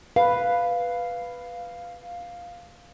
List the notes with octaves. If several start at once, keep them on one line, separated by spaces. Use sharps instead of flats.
B4 F5